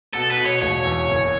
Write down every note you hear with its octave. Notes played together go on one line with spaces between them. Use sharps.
B2 A4
B4
B2
C#5
E1 C#5
E2
F#1